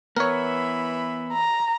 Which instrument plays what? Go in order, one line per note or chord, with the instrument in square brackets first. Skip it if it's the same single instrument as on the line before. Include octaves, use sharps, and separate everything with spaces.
[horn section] E3 E5 B5 [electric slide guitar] B3 [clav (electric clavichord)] A#4 C#5
[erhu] A#5